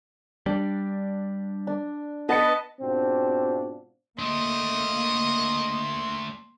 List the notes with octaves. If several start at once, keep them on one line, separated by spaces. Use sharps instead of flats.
G3 D4
D4
B3 B4 D#5 A5 C#7
G#2 B2 C4 D4 F4 F#4
A3 A#3 D4 D#5 C6